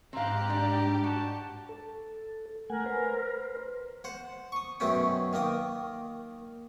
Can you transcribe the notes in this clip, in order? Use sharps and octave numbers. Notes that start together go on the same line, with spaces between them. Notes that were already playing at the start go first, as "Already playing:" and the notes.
G#2 C4 G4 F5 A#5 F#6
G3 D4
F#4 A5
A4
A3 A#4 F#5 G#5
B4 C5
C5 F#5
C#6 D#6
F#2 B2 A3 C4 C#4 G5
D#3 A#3 D#5 G5